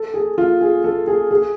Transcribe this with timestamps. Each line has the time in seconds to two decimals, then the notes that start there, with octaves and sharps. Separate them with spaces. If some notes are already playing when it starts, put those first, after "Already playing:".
Already playing: A4
0.14 G#4
0.38 F4
0.61 G#4
0.84 A4
1.07 G#4
1.31 G#4